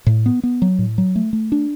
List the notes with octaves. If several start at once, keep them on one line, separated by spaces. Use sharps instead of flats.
A2
B3
B3
F#3
A2
F#3
A3
A3
D4